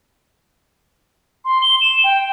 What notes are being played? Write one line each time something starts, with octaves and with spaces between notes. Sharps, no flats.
C6
G7
E7
G5